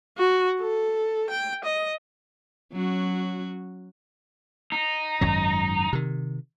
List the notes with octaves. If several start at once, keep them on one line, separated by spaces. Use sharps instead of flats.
F#4
A4
G5
D#5
F#3 C#4 F#4
D#4
G#1 F#2 F#3
C3 D#3